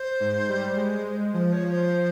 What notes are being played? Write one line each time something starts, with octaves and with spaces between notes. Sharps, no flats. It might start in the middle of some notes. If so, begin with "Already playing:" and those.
Already playing: C5
G#2
G3
G#3
F3 C5
C#5
C5